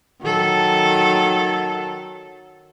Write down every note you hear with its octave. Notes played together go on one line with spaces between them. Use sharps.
D#3 F#3 A4